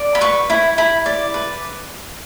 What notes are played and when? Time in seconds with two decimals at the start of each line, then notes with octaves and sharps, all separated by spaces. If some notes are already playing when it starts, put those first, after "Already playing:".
Already playing: D5
0.15 B5
0.21 B4 C#6
0.50 E4 B5
0.78 E4 B5
1.06 D5
1.34 B4